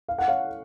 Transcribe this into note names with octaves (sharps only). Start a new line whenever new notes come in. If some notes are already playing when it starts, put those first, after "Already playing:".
F5
F#5
C#5 F5